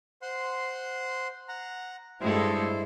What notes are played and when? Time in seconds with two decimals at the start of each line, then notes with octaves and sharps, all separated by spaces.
0.22 C5 F#5 C6
1.48 F#5 A#5
2.21 G2 G#3 E4 A4 C5